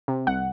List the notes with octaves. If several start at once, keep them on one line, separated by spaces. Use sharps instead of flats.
C3
C2 F#5